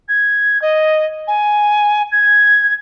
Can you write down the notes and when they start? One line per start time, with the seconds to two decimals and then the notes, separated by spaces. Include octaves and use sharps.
0.08 G#6
0.62 D#5
1.27 G#5
2.11 G#6